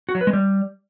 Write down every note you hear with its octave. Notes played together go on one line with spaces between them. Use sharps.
F#4
F#3
B4
G#3
G3